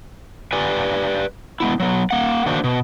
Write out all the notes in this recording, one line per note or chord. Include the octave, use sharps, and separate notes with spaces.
G4 B4 D5 G#5
G#3 B3 E4
F#3 B3
A#3 F#5
D#3 A#3 D4 F#4 C5
B2